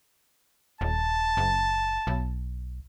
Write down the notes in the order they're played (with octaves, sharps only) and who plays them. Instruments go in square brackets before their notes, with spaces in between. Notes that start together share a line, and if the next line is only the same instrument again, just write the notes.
[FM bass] D#1 [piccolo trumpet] A5
[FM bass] F#1
B1